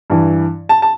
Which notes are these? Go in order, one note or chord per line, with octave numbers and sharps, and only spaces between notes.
G2 E3
A5
A5